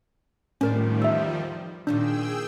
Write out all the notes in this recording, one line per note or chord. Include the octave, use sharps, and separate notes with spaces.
A2 D#3 F3 G3 C4 C#4 A#4 D5
E2 E5 E6
A#2 D#3 F3 D4 G#4 G5 E6